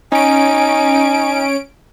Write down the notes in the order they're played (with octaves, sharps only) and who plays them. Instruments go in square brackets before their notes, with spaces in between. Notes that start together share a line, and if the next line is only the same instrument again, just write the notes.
[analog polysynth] C#4 D7 [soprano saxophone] D#4 [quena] G#5